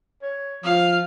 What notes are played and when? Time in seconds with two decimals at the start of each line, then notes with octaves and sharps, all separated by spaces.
0.22 C#5
0.64 F3 F5